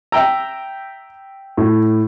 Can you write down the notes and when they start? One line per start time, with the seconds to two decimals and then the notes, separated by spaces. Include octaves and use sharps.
0.12 E5 G5 A#5 E6
1.57 A2